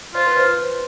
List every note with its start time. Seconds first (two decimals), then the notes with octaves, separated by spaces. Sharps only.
0.15 F4 C5
0.26 B4
0.37 C5